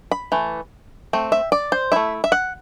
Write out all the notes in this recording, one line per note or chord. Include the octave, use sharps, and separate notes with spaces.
B5
E3 A3
A3 C4
E5
D5
C5
A3 E4 E5
E5
F#5